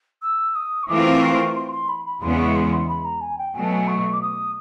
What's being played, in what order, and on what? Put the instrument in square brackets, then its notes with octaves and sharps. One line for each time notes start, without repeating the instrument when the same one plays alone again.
[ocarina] E6
D#6
C#6
[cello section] E3 A3 C4 F4 A#4 [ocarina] D6
[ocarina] C#6
C6
C6
B5
B5
[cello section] E2 C#3 E3 G#3 B3 [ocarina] C6
[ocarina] C#6
C6
C6
B5
A#5
G#5
G5
[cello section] B2 F#3 A3 [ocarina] G#5
[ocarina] A5
G#5
C#6
D6
D#6